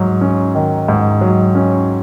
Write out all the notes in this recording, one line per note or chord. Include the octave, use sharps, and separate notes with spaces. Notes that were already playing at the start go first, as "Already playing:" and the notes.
Already playing: G#2 F#3
C#4
D#3
G#2
F#3
C#4